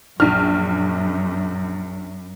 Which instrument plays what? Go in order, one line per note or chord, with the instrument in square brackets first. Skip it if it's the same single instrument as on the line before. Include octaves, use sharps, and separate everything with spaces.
[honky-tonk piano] A#1 F6 [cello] F#2